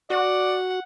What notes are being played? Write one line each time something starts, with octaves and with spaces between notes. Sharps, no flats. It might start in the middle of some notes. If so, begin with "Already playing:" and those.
F#4 D5 F#5